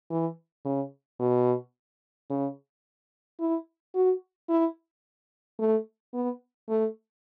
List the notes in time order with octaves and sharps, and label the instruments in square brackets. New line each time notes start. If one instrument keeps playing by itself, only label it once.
[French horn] E3
C#3
B2
C#3
E4
F#4
E4
A3
B3
A3